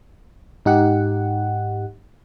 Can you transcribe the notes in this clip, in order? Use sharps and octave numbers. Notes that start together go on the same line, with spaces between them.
G#2 D#4 G4 F#5